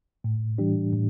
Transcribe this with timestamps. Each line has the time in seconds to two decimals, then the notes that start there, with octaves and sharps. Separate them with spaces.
0.24 A2
0.58 E3 G3 D4 G4
0.93 A2